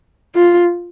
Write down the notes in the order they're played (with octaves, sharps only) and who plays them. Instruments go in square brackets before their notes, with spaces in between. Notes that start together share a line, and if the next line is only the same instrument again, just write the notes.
[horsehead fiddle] F4